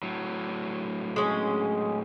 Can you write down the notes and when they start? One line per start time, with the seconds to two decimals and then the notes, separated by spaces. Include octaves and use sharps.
0.03 A2 F#3
1.16 G#3 C#4